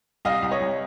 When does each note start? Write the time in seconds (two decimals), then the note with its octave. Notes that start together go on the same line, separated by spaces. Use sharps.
0.25 C2 D#5 F5
0.42 C2
0.51 C#5 D#5
0.60 C2